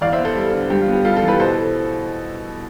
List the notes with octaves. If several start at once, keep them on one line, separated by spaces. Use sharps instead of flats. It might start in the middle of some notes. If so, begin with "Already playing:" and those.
E2 D5 F5
C5 E5
B3
A4 C5
G3
D3
G2 G4
F4
B3
G4
G3 F4 A4
F4 A4
E3
G4 B4
B2 A4 C5